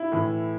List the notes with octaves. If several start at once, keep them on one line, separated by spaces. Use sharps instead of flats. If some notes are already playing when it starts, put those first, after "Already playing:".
Already playing: E4
A2 E3